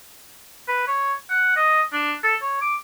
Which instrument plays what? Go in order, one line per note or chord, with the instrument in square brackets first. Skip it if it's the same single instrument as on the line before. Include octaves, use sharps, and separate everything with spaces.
[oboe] B4
C#5
F#5
D#5
D4
A4
C#5
D6